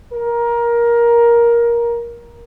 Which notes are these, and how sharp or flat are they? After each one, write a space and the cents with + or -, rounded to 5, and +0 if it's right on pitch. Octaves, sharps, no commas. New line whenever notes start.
A#4 +15